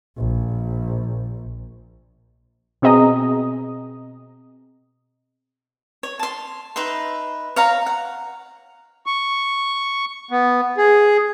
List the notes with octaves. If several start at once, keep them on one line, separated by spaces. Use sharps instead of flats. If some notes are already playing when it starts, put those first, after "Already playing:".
A#1
B2 C4 G#4 D#5 A#5 D#6
C#5
A5 C6
D#4 B4 E5 C6
C#5 F5 A#5
F#5
C#6
B3
G#4